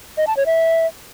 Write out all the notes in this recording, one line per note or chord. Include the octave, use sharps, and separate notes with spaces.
D#5
A5
C#5
E5